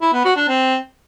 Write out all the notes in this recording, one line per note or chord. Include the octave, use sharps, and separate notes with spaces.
E4
B3
F#4
D4
C4